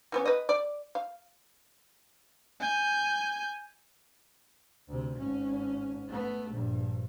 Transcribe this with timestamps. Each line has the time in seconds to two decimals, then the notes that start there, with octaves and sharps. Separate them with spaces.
0.12 E3 B3 C#4
0.25 B4 D#5
0.49 D5
0.95 F5
2.60 G#5 G6
4.88 D2 C3
5.19 G#1 C#4
6.08 A3 B3
6.51 A#1 G2